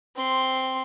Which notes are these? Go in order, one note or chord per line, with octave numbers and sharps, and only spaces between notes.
C4 C6